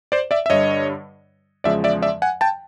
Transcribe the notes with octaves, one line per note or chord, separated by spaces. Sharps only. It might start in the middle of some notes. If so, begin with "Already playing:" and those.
C5 D5
D5 E5
E5
G2 D3 G3 C#5 D#5
E2 C#3 F3 G#3 D5 E5
D5 E5
D5 E5
F#5 G#5
G5 A5